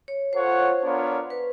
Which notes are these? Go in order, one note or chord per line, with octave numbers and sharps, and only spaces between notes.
C#5
F4 A4 C5 C#5 F#5
B3 D4 F4 A#4 C#5
B4